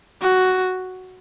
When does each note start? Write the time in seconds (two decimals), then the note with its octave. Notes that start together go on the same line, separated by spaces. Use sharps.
0.22 F#4